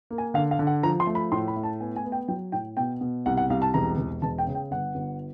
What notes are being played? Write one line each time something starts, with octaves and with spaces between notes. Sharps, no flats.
A#3
G#5
D3 F5
F5
D3
F#5
F3 A#5
C6
A3
B5
A2 C6
B5
A3
A5
B3 G#5
G#5
B3
G5
F#3 G5
A2 G5
B2 G5
B2
C2 F#5
F#5
C2 F5
A5
E1 A#5
E1
E1 A5
G5
C#3
G5
G1 F#5
G1